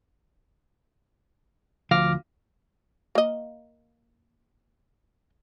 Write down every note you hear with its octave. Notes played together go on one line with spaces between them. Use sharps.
D2 F3 F5 D6 F6 A#6
A#3 D#5